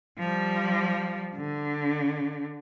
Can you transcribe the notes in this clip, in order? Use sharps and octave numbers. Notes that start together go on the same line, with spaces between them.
F3 G3
D3